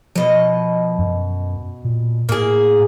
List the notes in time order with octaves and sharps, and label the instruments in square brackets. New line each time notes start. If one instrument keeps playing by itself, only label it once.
[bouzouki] B2 D#5 [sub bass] F3
[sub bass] F#2
A#2
[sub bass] A2 [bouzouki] A#3 G#4